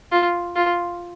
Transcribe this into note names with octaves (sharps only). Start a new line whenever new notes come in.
F4
F4